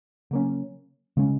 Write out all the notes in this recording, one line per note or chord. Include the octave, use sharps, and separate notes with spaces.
C#3 F#3 A#3 C#4
C#3 G#3 C#4